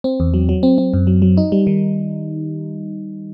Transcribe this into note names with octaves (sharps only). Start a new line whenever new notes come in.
C4
E2
F#3
F#3
C4
C4
F#2
F#3
F#3
D#4
G3
D#3